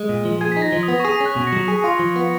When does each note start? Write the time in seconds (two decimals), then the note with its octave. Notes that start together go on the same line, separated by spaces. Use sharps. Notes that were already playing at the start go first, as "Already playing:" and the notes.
Already playing: G#3
0.09 A#2
0.25 F3
0.41 G#4 G#6
0.52 D#4 B6
0.62 A#6
0.72 F3
0.83 D#6
0.88 B3
1.00 C#6
1.05 G#4 D#6
1.20 C#4
1.26 F#6
1.36 B2
1.47 A#6 C#7
1.52 F#3
1.68 G#4 B6
1.84 F4
1.99 F3
2.16 B3
2.24 C#7